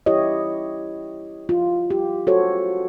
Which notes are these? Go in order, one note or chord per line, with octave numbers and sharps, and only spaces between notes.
E4 G4 C#5 D#5
F4
G4
F#4 A4 C5 C#5